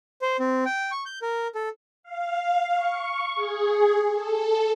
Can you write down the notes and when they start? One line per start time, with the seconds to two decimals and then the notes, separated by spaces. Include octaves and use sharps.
0.22 C5
0.40 C4
0.65 G5
0.91 C#6
1.06 G6
1.22 A#4
1.55 A4
2.03 F5
2.76 C#6
3.35 G#4
4.12 A4